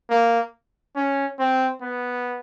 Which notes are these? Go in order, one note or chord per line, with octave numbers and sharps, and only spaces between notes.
A#3
C#4
C4
B3